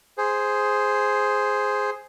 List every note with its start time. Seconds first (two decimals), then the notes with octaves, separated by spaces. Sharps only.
0.18 G#4 C5